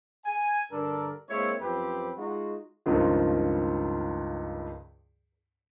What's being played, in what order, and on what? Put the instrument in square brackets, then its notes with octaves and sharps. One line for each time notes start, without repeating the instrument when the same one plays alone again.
[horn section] G#5
G2 D3 D4 A4 A#4
G#3 A#3 C4 E4 C#5
F#2 F3 C4 G4 B4 B5
G#3 D#4 F4 F#4
[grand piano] C#2 G2 D#3 F3